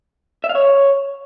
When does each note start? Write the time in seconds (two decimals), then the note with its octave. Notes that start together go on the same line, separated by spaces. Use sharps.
0.44 E5
0.49 F5
0.55 C#5